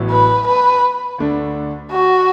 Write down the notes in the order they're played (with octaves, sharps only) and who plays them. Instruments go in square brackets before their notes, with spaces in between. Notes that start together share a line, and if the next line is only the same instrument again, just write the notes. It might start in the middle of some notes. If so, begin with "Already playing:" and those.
Already playing: [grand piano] A1 A2 F#3 B3 E4
[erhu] B4
B4
[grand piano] D2 D3 A3 D4
[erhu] F#4